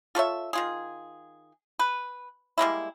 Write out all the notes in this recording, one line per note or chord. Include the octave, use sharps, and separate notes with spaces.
F4 A4 C#5 E5
D#3 F4 G#4
B4
G3 G#3 A#3 E4